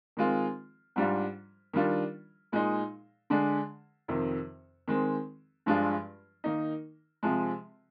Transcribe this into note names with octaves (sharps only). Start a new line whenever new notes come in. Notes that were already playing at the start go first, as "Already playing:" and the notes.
D#3 G#3 C4 F4
G#2 G3 D4 F4
D#3 G3 D4 F4
A#2 G#3 D#4
D3 G#3 D4
F2 C3 D#3
D#3 G#3 C4
G2 F3 G#3 D4 F4
D#3 A#3 D#4
C3 F3 G#3